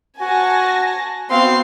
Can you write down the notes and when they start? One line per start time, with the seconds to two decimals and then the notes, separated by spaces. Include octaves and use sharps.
0.21 F#4 G#5 A5 A#6
1.30 B3 C4 F#4 F5 C6